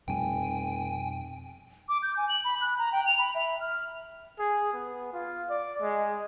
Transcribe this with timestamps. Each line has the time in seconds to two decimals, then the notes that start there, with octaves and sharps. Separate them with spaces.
0.08 F1 F2 B2 G3 G5 G#5
1.89 D6
2.03 G6
2.17 G#5
2.29 F#7
2.44 B5
2.61 F#6
2.79 A#5
2.92 G5
3.06 F7
3.19 B5
3.35 E5
3.61 F6
4.39 G#4
4.73 B3
5.13 F4
5.50 D5
5.82 G#3